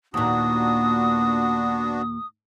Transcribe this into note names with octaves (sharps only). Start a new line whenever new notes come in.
D#2 A#2 B3 D4 F#4 D#6